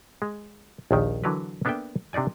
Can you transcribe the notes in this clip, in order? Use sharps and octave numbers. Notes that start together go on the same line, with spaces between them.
G#3
A#1 D#2 D#3
D3 E3 F#3 A#4 B4
A#3 B3 D4 A4 E5 G5
C3 D4 D#4 D5 G#5